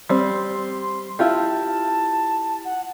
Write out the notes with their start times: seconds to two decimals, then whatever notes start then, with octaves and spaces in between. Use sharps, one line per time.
0.09 G3 C4 C6
1.19 E4 F4 G4 A5
2.65 F#5